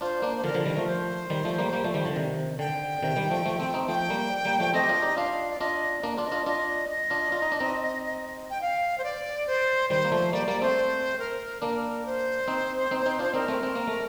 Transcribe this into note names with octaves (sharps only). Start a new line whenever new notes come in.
D4 F4 C5
A#3 D4
C5
D3 F3 A#4
D3 F3
D#3 G3
F3 A3
C5
D#3 G3
F3 A3
G3 A#3
G3 A#3
F3 A3
D#3 G3
D3 F3
C3 D#3
D3 G5
C3 D#3
D#3 G3
F3 A3
F3 A3
A3 C4
C4 D#4
F3 A3 G5
G3 A#3
G3 A#3
F3 A3
A3 C4 D#5
G4
D4 F4
D#4 G4
D4 F4 F5
D5
D4 F4 D#5
A#3 D4
D4 F4
D#5
D4 F4
D4 F4 D#5
D#5
D4 F4
F4
D#4
D4
C4 D#4
G5
F5
C5
D5
C5
D#3 G3 C5
A#3
F3 A3
G3 A#3 D5
G3 A#3 D5
A3 C4 C5
A#4
A#3 D4 A#4
C5
C4 D#4
C4 D#4
C4 D#4
D4 F4
C4 D#4 A#4
A3 C4
C4
A#3
A3